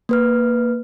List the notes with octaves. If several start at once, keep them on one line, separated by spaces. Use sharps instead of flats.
A#3 B4 F6